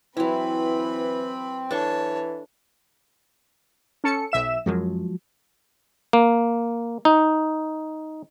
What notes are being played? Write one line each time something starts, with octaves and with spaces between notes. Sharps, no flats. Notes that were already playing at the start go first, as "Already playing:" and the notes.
E3 F#3 C4 E4 B4 B5
E3 D4 A4 C#5 A5 C#6
C#4 A4 C#7
B1 E5 E7
F#2 F3 F#3 G#3
A#3
D#4